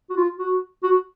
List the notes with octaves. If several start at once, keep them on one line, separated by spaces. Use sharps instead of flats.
F#4
F4
F#4
F#4